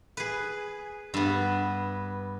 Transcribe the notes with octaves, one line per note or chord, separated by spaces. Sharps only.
G#4 B4
G2 B3